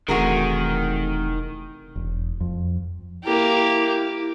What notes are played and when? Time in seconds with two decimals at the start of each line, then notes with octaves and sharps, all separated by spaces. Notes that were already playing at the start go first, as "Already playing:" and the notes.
0.08 E1 C3 D#3 E3 A3 F#4 G#4 A#4
1.96 E1
2.40 F2
3.24 A#3 E4 G4